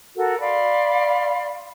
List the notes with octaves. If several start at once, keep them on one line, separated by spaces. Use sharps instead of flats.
F#4 A4 A#4
D5 F5 B5 C6